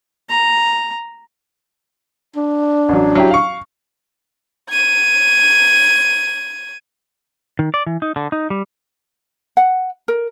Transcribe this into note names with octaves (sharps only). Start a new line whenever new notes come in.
A#5
D4
A1 F#3
F#3 E4 G4
F5 C#6
G#6 D#7
D#3
D5
E3
D#4
D3
D#4
G3
F#5
A#4